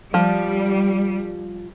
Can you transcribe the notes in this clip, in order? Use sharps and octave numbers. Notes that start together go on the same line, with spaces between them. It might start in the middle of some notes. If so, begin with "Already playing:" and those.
F3 G3